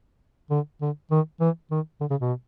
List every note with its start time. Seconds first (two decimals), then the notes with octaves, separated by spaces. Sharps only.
0.50 D3
0.81 D3
1.11 D#3
1.40 E3
1.71 D#3
2.00 D3
2.10 C#3
2.21 B2